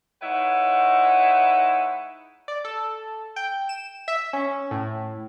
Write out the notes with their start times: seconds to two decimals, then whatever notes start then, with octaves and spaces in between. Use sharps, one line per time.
0.22 G#3 D#4 E4 B4 C#5 F#5
2.48 D5
2.65 A4
3.36 G5
3.69 E7
4.08 E5
4.33 C#4
4.71 A2